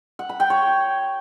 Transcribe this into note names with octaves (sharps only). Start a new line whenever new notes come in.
F#5
B5
G5
C#5